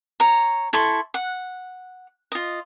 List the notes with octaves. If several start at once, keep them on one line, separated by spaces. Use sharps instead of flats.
C#5 A#5
E4 A4 C6 C#6
F#5
F4 D#5